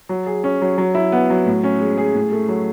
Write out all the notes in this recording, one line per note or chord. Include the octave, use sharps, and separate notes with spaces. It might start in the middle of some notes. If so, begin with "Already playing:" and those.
F#3
G#4
C#4
F#3
F#3
E4
B3
F#3
A2
C#4
G#3
G#4
A2
A3
F#3